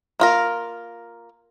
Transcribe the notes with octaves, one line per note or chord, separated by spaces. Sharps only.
A#3 F4 A#4